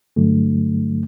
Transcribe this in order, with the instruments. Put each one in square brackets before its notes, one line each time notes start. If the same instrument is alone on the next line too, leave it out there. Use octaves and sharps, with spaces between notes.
[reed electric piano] G2 D3 F#3 A3